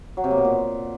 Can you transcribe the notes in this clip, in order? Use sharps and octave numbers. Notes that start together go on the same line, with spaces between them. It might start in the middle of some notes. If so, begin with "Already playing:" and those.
F#3
C3
A#3
B2
A#2